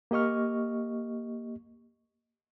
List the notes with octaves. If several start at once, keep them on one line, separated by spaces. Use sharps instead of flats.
A#3 G4 D#5 C#6 F6